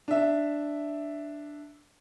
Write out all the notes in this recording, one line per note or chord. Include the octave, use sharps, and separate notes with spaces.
D4 E5